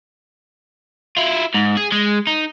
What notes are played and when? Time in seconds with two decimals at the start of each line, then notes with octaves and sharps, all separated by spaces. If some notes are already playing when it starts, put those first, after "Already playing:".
1.17 E4 F4
1.54 G#2
1.77 G#4
1.92 G#3
2.27 D#4